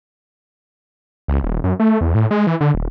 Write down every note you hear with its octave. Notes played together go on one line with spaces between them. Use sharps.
C#2
D#1
F#2
A3
E2
A2
G#3
E3
D3
D#1